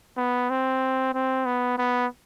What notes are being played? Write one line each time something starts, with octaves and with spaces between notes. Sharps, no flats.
B3
C4
C4
B3
B3